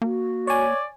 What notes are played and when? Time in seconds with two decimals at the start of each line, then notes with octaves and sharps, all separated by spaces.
0.02 A#3 F#4
0.47 C#5 D5 G#5